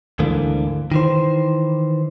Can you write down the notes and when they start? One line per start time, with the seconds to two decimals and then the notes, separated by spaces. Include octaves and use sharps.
0.19 D2 G#2 D3 E3 A#3
0.92 D#3 E3 C5